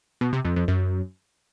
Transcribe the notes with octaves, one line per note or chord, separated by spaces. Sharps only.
B2
C3
F2
F2
F#2